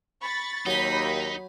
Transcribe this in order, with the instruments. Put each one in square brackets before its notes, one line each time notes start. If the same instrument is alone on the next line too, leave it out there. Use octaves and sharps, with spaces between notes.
[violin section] B5 C#6 A6
[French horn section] D#2 [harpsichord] F#3 G#5 [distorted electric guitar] D#4 [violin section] B5 G6 B6